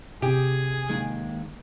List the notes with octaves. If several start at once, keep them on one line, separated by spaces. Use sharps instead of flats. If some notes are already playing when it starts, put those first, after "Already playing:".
C3 G4 G#4
D#2 D#3 G#3